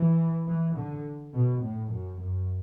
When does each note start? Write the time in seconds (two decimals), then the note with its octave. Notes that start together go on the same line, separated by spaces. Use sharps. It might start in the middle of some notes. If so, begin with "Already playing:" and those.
Already playing: E3
0.47 E3
0.76 D3
1.33 B2
1.62 A2
1.90 F#2
2.20 F#2